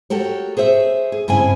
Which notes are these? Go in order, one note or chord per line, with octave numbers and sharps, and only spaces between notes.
F#4 G4 A4 A#4 C#5
G#4 C5 C#5 E5
G#4
G2 C#3 C4 E4 G#5